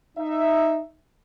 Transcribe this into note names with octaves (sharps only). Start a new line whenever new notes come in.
D#4 E5